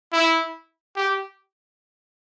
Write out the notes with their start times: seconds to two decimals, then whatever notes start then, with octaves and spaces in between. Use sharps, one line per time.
0.13 E4
0.96 G4